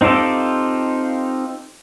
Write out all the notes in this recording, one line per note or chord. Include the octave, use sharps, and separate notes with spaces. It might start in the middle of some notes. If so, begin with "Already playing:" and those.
C4 D#4 F4 G4 A4